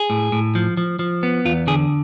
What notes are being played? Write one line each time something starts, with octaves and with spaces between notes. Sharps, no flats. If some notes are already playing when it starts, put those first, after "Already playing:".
Already playing: G#4
A2
A2
F3
F3
F3
B3
E2 F4
D3 G#4